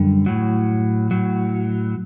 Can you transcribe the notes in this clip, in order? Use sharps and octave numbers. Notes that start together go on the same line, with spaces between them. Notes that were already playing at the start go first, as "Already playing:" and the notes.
Already playing: F#2 D3 G3
A2 F#3
A2 F#3